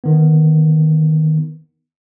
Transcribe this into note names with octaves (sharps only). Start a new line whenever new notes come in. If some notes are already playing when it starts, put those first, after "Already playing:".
D#3 B3